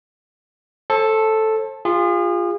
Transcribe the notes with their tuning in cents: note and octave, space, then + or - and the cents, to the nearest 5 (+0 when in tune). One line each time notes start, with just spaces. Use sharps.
A4 +0 C5 +40
F4 +0 G#4 -40